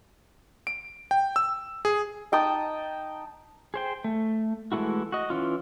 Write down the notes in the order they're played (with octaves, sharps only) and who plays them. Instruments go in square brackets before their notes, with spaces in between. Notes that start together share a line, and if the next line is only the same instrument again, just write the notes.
[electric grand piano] D7
G5
E6
G#4
[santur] D#4 G5 A5 D#6
[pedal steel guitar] G#4 C5 G5
A3
E3 G#3 A3 E4 F#4
F#4 D#5
E3 C#4 F4